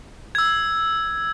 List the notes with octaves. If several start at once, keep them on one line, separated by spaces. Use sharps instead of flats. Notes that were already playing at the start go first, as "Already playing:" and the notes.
E6 G#6